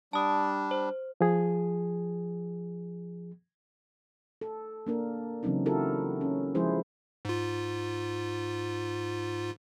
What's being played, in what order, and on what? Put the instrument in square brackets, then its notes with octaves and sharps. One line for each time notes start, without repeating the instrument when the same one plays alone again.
[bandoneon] G3 D4 [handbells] A5 D#6
[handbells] C5
[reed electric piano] F3 G#4
[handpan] A4
A#3 D4 A#4
C#3 E3 F#3 C4 C#4 D#4
E4 F#4 G4 A4 A#4
C#4
F3 G#3 E4 G#4 C5
[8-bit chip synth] G#2 F4